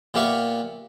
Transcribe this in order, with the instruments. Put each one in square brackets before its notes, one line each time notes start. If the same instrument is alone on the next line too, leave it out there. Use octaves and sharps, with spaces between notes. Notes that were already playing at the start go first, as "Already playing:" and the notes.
[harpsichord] A#2 B3 G4 E5 F5 C#6